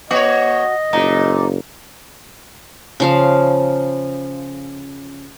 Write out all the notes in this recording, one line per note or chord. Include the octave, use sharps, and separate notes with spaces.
A#3 F#4 C#5 D#5
F#1 A#2 D#4
C#3 F3 F5